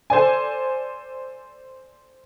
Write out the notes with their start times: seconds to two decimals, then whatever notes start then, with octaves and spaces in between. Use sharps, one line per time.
0.10 A4 C5 D5 G#5